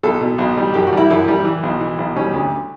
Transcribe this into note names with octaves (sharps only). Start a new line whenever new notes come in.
B1 A4
B2
B1
G3
F#2 G4
F#4
G3 E4
F#2 E4
G3
E3
B1
E3
B1
G3 C#4
D2